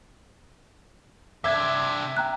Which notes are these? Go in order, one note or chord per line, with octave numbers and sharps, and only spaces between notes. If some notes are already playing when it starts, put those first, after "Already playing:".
C3 D4 E5 G#6
G5 A#5 F#6